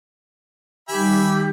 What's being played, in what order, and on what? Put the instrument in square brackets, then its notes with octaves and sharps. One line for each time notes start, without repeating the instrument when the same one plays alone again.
[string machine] D#3 G3 [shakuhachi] G4 [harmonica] E5 G#5 B5